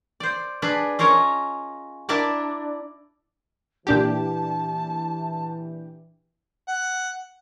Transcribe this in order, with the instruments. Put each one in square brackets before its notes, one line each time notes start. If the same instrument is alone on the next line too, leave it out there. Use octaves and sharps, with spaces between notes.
[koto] C5 D5
D4 G#4 B4
C#4 F4 A#4 C#5 D#5
D4 E4 A#4 D5 A5
[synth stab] A#2 D4 G4 [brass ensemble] E3 [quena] A5
[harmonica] F#5